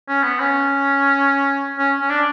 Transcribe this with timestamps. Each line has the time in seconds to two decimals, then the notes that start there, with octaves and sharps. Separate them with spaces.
0.08 C#4
0.23 B3
0.39 C#4
1.78 C#4
2.01 C#4
2.10 D4